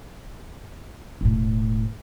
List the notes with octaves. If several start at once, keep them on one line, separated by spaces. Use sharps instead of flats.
E1 A2